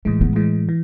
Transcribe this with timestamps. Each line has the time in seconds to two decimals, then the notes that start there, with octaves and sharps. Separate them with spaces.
0.05 A2 E3 G#3 A3
0.21 B3
0.36 A2 E3 G#3
0.69 E3